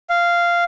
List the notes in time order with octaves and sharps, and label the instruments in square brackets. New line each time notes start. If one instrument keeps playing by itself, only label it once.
[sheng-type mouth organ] F5